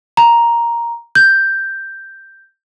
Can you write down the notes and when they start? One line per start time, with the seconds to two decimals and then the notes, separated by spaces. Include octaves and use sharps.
0.17 A#5
1.15 G6